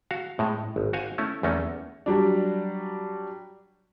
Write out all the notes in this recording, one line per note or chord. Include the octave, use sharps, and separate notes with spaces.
F#4 F5
A2 G#3
G#1
F#4 C5 F5 G#5
A3 C#4 E4
E2 A3 A#3 C#4
F#3 G3 D4